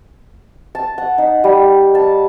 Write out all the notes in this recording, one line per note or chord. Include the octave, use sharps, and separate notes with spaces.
A5
F#5
D#4
G3
A5